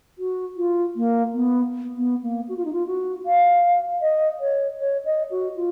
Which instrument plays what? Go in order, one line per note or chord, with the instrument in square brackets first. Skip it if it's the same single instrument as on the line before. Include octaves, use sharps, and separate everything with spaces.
[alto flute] F#4
F4
A#3
B3
B3
A#3
F#4
F4
D#4
F4
F#4
F5
D#5
C#5
C#5
D#5
F#4
F4